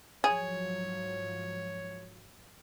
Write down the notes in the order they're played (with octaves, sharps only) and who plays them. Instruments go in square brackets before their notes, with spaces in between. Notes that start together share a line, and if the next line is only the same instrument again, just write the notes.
[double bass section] G#2 F3 F#3 [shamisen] G#4 [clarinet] C#5